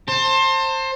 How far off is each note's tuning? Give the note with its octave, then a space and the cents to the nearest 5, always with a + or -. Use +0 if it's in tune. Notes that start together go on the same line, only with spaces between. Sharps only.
C5 +20 A5 +35